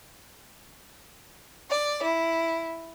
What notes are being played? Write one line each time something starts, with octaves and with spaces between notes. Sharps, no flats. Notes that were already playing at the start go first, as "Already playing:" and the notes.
D5
E4